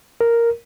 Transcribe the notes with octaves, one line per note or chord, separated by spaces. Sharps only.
A#4